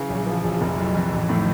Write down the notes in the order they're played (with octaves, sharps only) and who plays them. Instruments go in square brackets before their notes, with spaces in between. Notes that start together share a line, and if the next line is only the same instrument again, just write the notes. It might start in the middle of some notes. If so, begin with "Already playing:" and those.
Already playing: [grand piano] C#3 [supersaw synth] E3 F#3
[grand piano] A#1
F3
A#1
[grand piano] F1 [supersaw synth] E3 F#3
[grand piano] F2
F2
[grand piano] A1 [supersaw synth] D#3 F3
[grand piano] A2